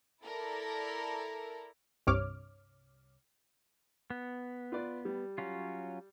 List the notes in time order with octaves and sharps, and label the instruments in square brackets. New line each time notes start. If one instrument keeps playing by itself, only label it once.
[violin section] E4 A4 A#4 D5 A#5
[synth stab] C2 G2 C3 C#5 D6 F6
[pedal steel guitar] B3
[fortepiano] F4 B4 D5
G3
[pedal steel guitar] F#3 C#4 F4